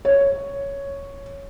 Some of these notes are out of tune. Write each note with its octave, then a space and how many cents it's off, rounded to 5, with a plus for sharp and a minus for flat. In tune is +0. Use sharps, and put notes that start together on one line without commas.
C#5 +5